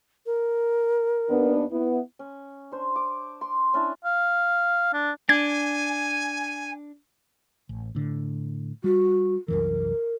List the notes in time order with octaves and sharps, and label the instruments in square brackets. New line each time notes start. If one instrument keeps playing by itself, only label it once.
[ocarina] A#4
[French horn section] D#2 B3 D4
B3 E4
[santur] C#4
D4 C5
D6
C6
C#4 D4 E4 A5
[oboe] F5
D4
[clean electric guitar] D4 [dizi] G#5 [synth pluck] G#6
[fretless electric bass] A1
A2 D3
[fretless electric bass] G3 [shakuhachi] F#4
[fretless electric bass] C2 F#2 E3 [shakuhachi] A#4